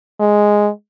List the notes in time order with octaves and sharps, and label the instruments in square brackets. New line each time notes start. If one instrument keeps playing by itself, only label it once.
[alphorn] G#3